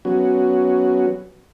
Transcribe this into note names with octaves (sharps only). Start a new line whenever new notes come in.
F#3 B3 C#4 F#4